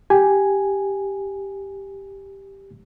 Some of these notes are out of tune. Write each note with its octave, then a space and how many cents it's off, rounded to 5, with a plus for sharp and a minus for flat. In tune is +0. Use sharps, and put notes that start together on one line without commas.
G4 +0 G#5 +0